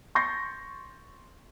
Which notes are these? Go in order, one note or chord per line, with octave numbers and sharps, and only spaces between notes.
C6 C#6 G6 A6 A#6 C7